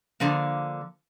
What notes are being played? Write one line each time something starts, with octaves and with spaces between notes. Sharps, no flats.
D3 F3 A#3